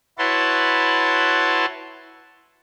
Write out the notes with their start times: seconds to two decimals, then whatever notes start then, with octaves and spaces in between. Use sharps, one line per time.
0.18 E4 F#4 B4 C#5 A5 C6